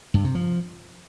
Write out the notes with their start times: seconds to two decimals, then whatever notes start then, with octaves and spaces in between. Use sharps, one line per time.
0.14 G2
0.24 C3
0.35 F3